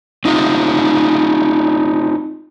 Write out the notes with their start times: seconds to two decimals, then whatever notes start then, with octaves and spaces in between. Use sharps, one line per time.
0.25 C4 D#4 F4